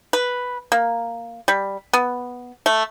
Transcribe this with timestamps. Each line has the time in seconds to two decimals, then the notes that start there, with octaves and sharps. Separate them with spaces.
0.13 B4
0.72 A#3
1.48 G3
1.93 B3
2.66 A3